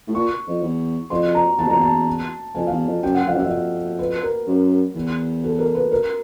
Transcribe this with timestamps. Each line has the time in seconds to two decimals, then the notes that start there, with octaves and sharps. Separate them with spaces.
0.07 A2
0.15 A#2 C#6
0.47 F2
0.63 E2
1.10 F2 C6
1.35 A#5
1.58 E2 A5
1.67 F2
1.70 E2 A#5
1.82 A5
2.55 F2 G#5
2.67 E2 F5
2.87 F2
3.03 F#2 G5
3.15 F#5
3.27 F2 F5
3.36 F#2
3.39 E5
3.44 F2
3.51 E5
3.99 B4
4.23 A#4
4.47 F#2
4.95 E2
5.43 A4
5.59 A#4
5.75 B4
5.92 A#4